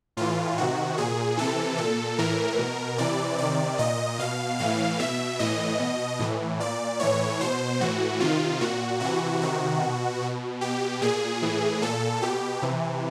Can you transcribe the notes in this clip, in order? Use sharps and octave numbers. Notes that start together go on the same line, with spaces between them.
A2 E3 F4
C3 D#3 F#4
A#2 G#4
C3 E3 A4
A#2 A4
A2 E3 A#4
B2
C3 E3 D5
C3 D#3 D5
A#2 D#5
B2 F5
A2 E3 F5
B2 E5
A2 E3 D#5
B2
A2 E3
A#2 D5
A2 E3 C#5
B2 C5
A2 E3 F#4
C3 D#3 F4
A#2 F#4
C3 E3 F#4
C3 D#3 F#4
B2
B2
B2 G4
A#2 G#4
A2 E3
A#2 A4
B2 G4
C3 E3